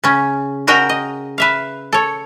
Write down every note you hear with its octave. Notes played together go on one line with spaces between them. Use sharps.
C#3 C#4
C#3 F#4 A#4 D#5 G5 A#5
D#5
B4 E5 F5
A4 C#5